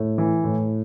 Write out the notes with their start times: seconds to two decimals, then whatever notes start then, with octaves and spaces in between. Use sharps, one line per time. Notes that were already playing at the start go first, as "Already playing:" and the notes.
Already playing: A2
0.18 E3
0.44 A2